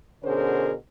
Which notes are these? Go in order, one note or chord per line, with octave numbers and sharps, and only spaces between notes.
B2 D3 C#4 G#4 A#4 C5